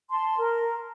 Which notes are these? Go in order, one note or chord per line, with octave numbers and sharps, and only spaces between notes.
A5 C6
A#4